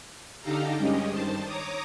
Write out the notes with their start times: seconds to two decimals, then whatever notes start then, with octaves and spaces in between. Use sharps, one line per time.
0.41 D3 D#4 G4 A4 F5 A#5
0.77 G2 G#3 C#4 G4 D#5
1.08 G2 D#3 C5 A5
1.44 C#5 A#5 D6 D#6